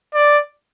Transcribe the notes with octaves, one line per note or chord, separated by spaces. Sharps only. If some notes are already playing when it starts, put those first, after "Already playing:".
D5